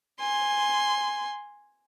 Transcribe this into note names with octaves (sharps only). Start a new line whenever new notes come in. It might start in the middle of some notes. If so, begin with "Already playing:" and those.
G#5 C6